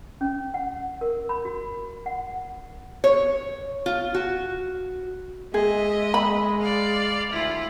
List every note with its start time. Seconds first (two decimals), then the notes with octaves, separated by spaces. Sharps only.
0.21 C#4
0.54 F#5
1.01 A#4
1.29 B5
1.45 F#4
2.06 F#5
3.04 C#5
3.86 F4
4.14 F#4
5.54 G#3 G#4 D#5 E5
6.14 B5
6.62 D5 F5
7.32 D2 E4 F4